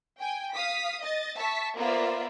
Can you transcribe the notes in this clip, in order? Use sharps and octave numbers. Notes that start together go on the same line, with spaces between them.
G5 G#5
F5 D#6 B6
D#5 A6
E5 A5 C#6 B6
A#3 B3 F4 C5 D5 E5